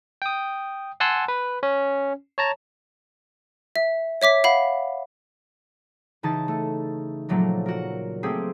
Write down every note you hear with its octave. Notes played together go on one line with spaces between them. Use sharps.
G5 D#6
F#5 G#5 A5 C6 E6 F#6
B4
C#4
C#5 A5 A#5
E5
C#5 E5 D6 B6
F5 F#5 B5
C#3 E3 D#4 A5 C#6 A6
A3
A#2 F3 F#3 A3 A#3
F#4 A#4
A3 A#3 C4 G4 G#4